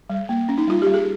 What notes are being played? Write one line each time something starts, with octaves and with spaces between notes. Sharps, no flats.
G3
A#3
C#4
D#4
G3 F4
G4
G3
G#4